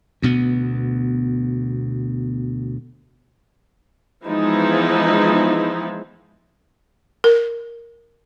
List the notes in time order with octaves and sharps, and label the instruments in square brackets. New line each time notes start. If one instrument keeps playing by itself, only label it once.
[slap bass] D2 B2 B3
[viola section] E3 F3 G#3 B3 D#4 E4
[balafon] A#4